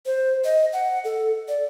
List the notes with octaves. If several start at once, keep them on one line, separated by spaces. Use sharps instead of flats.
C5
D#5
F#5
A4
D5